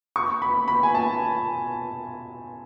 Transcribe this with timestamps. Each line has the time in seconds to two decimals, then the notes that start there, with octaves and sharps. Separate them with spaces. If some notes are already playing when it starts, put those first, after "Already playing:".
0.16 C#6
0.42 B5
0.68 B5
0.83 G#5
0.95 A5